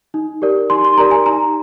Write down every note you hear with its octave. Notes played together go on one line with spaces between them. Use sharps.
D#4
G4 A#4 D5
D#4 C6
C6
G4 A#4 D5 A#5
G#5
D#4 A#5